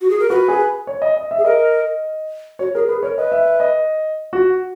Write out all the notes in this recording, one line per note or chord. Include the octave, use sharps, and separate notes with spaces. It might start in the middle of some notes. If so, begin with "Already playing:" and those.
F#4
G#4
A#4
F#4 B4
G#4
C#5
D#5
D#5
E5
G#4
A#4 D#5
F#4 C#5
G#4 A#4
G#4 B4
A#4 C#5
B4 D#5
E5
E5
D#5
F#4